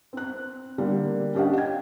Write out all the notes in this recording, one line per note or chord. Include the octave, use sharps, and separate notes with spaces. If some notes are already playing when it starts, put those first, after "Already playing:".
C4 F#6
D3 G3 A#3
C#4 D4 G4 D#5 F5 F#5
G5 G#6